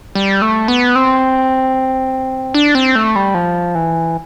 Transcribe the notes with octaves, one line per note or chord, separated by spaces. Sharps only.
G3
A3
B3
C4
D4
C4
A3
G3
F3
E3